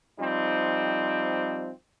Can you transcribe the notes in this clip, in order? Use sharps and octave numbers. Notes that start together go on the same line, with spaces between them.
F3 G3 C4 D#4